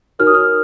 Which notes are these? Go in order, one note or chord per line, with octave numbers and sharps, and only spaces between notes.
D#4 F#4 A#4 C#5 F6
D#6
F6